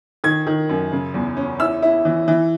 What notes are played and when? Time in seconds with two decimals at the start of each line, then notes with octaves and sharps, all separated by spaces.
0.24 D#3 G#6
0.47 D#3
0.69 F#2
0.92 C#3
1.14 E2
1.37 C#4
1.59 E4 E6
1.82 E4
2.05 E3
2.28 E3